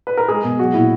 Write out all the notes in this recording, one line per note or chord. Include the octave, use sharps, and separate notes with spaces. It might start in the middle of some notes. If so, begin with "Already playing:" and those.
B4
A#4
G#3 G#4
B2
F#3 F#4
A#2 E4